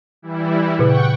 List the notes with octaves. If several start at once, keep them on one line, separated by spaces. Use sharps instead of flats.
E3 G3 E4
A#2 C#3 F#5 G5 C#6